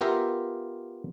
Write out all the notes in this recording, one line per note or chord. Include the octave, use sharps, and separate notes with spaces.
B3 F4 G4 A#4 E5 F5